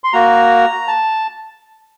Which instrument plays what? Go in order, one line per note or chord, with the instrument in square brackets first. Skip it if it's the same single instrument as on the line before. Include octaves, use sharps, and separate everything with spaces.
[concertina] C6
A#3 F#4 A#5
A5